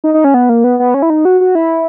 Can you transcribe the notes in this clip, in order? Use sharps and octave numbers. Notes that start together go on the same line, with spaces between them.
D#4
D#4
C#4
B3
A#3
B3
B3
C#4
E4
D#4
F#4
F#4
E4